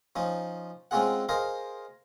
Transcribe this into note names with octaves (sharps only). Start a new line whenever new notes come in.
F3 C#4 D#4
G#3 C4 C#4 F4 G#4 F#5
G#4 A#4 C5 D#5 F5